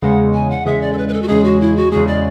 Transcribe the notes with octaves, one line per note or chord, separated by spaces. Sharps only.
E2 C#3 G#3 F#5
G#5
F#5
E2 C#3 G#3 E5
D5
A4
B4
B4
A4
F#4
E2 C#3 G#3 G#4
F#4
E4
F#4
E2 C#3 G#3 G#4
D5